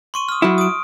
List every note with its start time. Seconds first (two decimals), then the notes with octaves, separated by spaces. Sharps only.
0.14 C6 C#6 D#7
0.29 D#6 F6
0.42 F#3 E4
0.58 D#6 D7